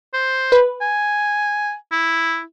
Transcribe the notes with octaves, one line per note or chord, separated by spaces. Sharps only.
C5
B4
G#5
E4